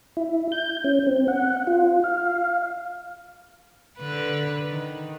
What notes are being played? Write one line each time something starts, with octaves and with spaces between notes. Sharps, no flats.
E4
G6
C#4
C4
F#5
F4
F5
D3 B4
D#3